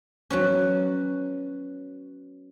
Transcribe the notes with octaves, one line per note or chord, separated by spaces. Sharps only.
F#3 B3 C#4